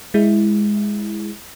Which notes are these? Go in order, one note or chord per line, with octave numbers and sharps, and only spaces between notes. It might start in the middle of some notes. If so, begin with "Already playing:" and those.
G#3 E4